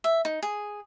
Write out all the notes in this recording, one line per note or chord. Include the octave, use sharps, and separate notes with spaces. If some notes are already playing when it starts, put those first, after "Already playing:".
E5
D#4
G#4